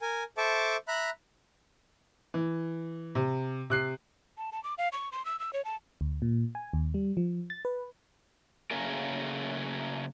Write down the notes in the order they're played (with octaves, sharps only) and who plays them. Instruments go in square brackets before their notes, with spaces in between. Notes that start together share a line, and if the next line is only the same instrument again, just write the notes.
[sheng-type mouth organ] A#4 G#5
A4 C5 E5 A5 C#6 D6
E5 A#5 B5 F#6
[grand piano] E3
C3
C3 F#6 C7
[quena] A5
A5
D6
F5
C#6
C6
E6
E6
C#5
A5
[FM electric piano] D2
A#2
G#5
D#2
G3
F3
A6
B4
[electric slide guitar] C#3 F#3 A3 A#3 G#4 A#4